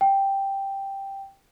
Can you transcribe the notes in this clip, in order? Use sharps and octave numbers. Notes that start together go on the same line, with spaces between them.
G5